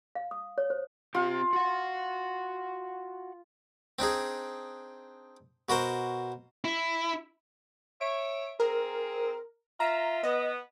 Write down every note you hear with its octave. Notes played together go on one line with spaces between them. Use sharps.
F5
D#6
C#5
C5
C4 F4 G4
F#4 F#5
C4 D4 D#4 G#4
B2 F#4 A#4 C5
E4
C#5 E5 D7
C4 G#4 A#4
F4 E5 A#5
B3 D#5